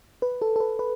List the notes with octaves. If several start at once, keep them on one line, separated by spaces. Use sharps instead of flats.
B4
A4
A4
B4
B4